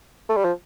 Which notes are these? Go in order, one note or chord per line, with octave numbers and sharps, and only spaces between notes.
A3
G3
F3